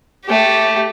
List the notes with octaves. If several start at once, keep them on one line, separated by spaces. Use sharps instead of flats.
A3 G4